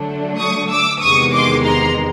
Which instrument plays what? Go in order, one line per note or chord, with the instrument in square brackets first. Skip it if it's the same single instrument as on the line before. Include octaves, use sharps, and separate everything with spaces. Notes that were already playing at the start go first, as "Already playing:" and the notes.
Already playing: [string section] D3 F#3 A3 D4
[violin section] C#6 D#6
D6 E6
[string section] E2 C3 D#3 G#3 [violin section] C#6 D#6
[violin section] C6 D6
A#5 C6